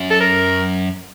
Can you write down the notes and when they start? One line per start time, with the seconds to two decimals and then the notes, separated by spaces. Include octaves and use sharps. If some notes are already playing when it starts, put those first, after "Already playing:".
Already playing: F#2
0.10 A4
0.21 A#4